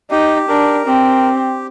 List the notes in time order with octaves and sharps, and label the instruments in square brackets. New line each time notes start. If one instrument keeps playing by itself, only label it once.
[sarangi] D#4 [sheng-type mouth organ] G4
[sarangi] D4 [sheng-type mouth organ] A#4
[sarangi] C4 [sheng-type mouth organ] G4